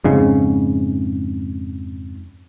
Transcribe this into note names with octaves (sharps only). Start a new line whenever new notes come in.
F2 G#2 C#3